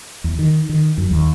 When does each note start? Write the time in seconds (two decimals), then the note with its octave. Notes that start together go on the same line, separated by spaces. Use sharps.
0.24 E2
0.39 D#3
0.69 D#3
0.98 F#2
1.11 D#2